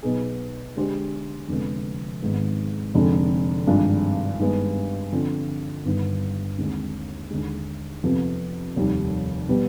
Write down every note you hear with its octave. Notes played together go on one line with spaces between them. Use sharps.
B1 B2 B3 D#4 G#4
D3 G#3 D4 G4 C5
F1 F2 D3 G#3 B3
G#1 G#2 D#3 B3
F1 F2 D3 G#3 C4
G#1 G2 F3 G#3 D4
G2 D#3 G#3 B3
D3 F3 C4
G1 G2 D#3 B3
D#2 D3 G#3 C4
D#2 D3 G#3
F2 C3 F3 B3
F1 D#2 D#3 G3
B2 G3 B3